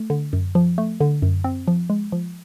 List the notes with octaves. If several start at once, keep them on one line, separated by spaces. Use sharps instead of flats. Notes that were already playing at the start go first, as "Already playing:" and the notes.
Already playing: A3
D3
F#2
F3
A3
D3
F#2
C4
F3
G#3
F3